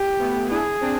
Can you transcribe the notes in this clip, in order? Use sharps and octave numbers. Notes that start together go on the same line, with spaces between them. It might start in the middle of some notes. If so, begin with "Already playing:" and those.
Already playing: G4
A3 B3
D4 E4 G#4
C4 D4